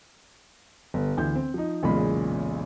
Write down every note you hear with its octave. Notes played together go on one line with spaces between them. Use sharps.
G1
D2 E3 G6
C4
F3 D#4
B1 E2 A#2 C#3 G#3 B5